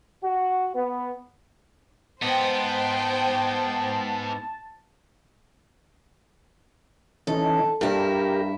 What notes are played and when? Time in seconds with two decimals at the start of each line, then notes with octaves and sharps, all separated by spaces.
0.22 F#4
0.74 B3
2.22 G#2 B3 C5 G5 A5
7.27 E3 C#4 D#4 A4
7.81 G2 E4 G4 A#4